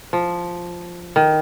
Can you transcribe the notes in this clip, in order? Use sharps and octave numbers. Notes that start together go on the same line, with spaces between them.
F3
D#3